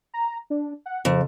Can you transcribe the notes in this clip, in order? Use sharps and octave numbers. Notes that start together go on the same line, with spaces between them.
A#5
D4
F#5
F2 C#3